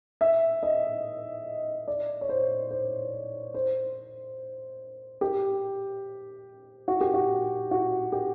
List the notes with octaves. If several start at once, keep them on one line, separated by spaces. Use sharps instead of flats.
E5
D#5
D5
C#5
C5
C5
C5
G4
F#4
G4
F#4
F#4
G4